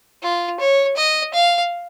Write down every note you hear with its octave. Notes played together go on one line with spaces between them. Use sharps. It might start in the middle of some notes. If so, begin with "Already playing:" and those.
F4
C#5
D#5
F5